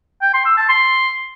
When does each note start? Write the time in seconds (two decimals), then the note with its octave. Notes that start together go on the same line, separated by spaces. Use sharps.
0.22 G5
0.34 C6
0.46 E6
0.57 A5
0.69 C6